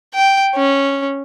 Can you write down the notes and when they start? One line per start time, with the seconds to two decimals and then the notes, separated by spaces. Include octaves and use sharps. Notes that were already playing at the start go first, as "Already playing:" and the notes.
0.14 G5
0.55 C#4